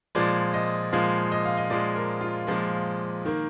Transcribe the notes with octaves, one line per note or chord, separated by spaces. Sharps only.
A#2 F3 G#3 D5
D#5
A#2 F3 G#3 F5
D#5
F5
D#5
A#2 F3 G#3 D5
A#4
F4
A#2 F3 G#3
D#3 A#3